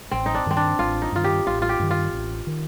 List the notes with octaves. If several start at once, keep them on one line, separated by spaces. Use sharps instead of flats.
A1 C4
D#4
D4
G2 D#3 C4
D4
A1 F4
D#4
G2 D#3 F4
G4
A1 F4
F4
G4
G2 D#3
F4
A1
D#3